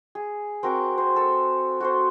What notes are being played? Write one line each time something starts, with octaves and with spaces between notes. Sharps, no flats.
G#4
C4 F#4 A#4 A#5
A#3 C5
A4
F#4 A4 C5